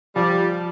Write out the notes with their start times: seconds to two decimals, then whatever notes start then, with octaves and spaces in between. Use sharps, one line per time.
0.15 F3 G3